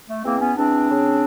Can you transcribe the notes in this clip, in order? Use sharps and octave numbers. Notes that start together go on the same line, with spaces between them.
A3
E2 A#3 C4
B3 C#4
E2 C4 D4
C#3